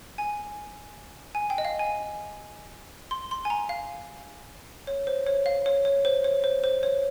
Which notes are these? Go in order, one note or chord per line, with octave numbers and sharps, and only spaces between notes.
G#5
G#5
G5
D#5
F5
G#5
C6
C6
G#5
A#5
F5
C#5
C5
C#5
F5
C#5
C#5
C5
C#5
C5
C5
C#5